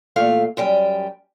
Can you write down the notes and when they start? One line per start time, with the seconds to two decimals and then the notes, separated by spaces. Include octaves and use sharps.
0.16 E2 A#2 A3 F5
0.57 F#2 G3 G5 G#5